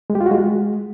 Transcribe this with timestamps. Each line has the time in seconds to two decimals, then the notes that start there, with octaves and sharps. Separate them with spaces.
0.10 G#3
0.15 G4
0.21 F4
0.26 F#4
0.31 G#3